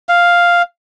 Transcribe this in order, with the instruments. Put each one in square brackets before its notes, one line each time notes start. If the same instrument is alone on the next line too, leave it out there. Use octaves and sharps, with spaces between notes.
[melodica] F5